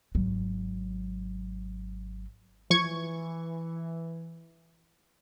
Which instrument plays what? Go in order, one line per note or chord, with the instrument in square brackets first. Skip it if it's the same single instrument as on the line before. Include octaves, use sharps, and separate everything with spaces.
[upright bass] G#1 F#3
[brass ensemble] E3 [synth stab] F3 C#6 G#6